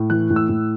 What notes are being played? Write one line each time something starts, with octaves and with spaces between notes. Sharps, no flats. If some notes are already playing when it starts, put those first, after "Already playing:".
Already playing: A2
E3 F#6
A2
E6
A2